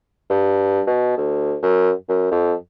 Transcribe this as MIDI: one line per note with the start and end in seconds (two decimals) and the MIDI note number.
0.30 0.82 43
0.87 1.16 47
1.17 1.56 38
1.63 1.91 42
2.09 2.28 42
2.31 2.53 41